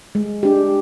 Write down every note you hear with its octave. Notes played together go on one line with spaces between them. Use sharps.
G#3
D4 G4